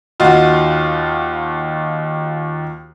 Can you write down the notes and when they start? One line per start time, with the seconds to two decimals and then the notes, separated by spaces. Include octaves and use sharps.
0.20 D#2 D#4 F4 F#4